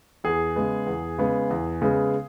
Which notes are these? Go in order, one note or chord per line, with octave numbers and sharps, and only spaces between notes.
E2 G#4
C#3 G#3 B3
E2
C#3 G#3 B3
E2
C#3 G#3 B3